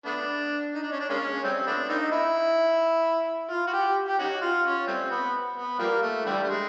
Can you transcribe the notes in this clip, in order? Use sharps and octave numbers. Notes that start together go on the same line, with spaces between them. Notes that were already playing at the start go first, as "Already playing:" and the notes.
A3 B3 D4
D#4
D4
C#4
D4
G#3 A#3 C#4
G3 A3 C4
A3 B3 D4
A#3 C4 D#4
E4
F4
F#4
G4
G4
C#4 D#4 F#4
F4
C#4
G3 A3 C4
B3
B3
F3 G3 A#3
A3
D3 E3 G3
A3
G#3